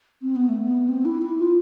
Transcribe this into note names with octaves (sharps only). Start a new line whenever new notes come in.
C4
B3
A3
B3
C4
E4
E4
F4